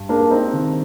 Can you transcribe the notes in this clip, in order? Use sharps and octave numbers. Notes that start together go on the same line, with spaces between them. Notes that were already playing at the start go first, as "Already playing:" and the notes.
Already playing: G2
G#3 A#3 D4
C4 D#4
D#3